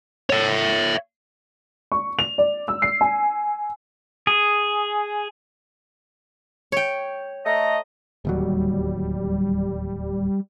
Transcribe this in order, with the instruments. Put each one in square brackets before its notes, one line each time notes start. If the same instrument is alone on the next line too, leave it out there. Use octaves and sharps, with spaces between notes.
[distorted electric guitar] C#5 E5
[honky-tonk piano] C#6
F7
D5
E6
C7
G#5
[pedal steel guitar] G#4
[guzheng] C#5 G5
[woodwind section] A3 D#5 A#5
[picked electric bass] D1 D#2 F#3 [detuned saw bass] G3